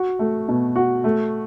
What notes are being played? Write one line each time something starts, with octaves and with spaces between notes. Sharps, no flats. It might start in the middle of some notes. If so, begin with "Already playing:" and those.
Already playing: F#4
A3
B2
F#4
A3